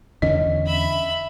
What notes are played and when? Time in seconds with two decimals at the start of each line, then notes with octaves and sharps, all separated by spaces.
0.22 E2 D3 C#4 D#5
0.66 E5 B5